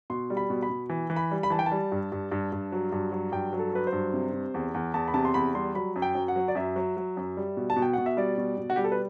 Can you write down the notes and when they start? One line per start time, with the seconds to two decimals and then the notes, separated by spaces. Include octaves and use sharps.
0.10 B2 C6
0.30 G3
0.37 B5
0.50 B2
0.63 B5
0.70 B2
0.89 E3
1.10 E3
1.16 B5
1.31 G3
1.43 B5
1.50 E3 A5
1.59 G5
1.66 A5
1.72 G3
1.92 G2
2.12 G2
2.32 G2
2.52 G2
2.72 F#3
2.92 G2
3.12 F#3
3.32 G2 G5
3.53 F#3
3.59 A4
3.73 F#3 B4
3.87 C5
3.93 G2
4.13 C3
4.33 C3
4.54 E2
4.74 E2
4.94 E2 A5
5.08 B5
5.14 C3 A5
5.25 C6
5.34 E2 B5
5.55 G3 C6
5.75 F#3 B5
5.96 F#2
6.02 G5
6.15 F#2
6.28 F#5
6.36 F#3
6.48 D5
6.55 F#2 E5
6.76 F#3
6.97 F#3
7.17 F#2
7.37 G3
7.57 B2
7.70 A5
7.76 B2
7.82 G5
7.93 B2 F#5
8.06 E5
8.17 G3 D5
8.38 B2
8.58 B2
8.70 F#4
8.76 G3 G4
8.84 A4
8.92 B4